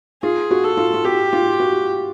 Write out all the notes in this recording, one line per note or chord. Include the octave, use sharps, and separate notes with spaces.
F4 G#4
F#4
A4
F4
F4
F#4 G4
F4
F#4